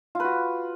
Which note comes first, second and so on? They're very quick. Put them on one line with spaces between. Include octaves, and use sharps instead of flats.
F4 B4 F#4